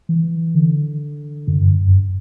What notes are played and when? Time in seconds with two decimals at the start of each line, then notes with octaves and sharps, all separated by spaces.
0.09 E3
0.55 D3
1.47 F#2
1.60 G2
1.73 F#2
1.87 G2